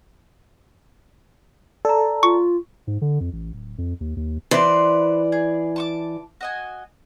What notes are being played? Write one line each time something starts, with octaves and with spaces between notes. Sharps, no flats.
A4 D5 A#5
F4 C#6
G#2
D3
F2
A1
D1
F2
D#2
D#2
E3 B4 C5 D5 C6
G#4
A5 C#6 D6
F#4 D#5 G#5